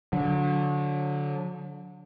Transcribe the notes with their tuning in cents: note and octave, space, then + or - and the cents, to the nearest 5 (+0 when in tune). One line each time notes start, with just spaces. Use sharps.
D3 -20 F#3 -35